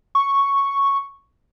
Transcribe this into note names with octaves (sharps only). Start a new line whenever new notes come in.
C#6